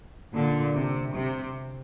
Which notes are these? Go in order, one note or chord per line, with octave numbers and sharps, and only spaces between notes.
A#2 D3
C3
C3